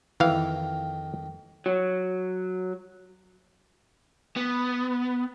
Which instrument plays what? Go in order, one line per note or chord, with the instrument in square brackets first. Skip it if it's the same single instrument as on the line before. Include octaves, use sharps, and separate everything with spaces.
[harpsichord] F2 D#3 [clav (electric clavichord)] E3 F5
[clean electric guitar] F#3
[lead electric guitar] B3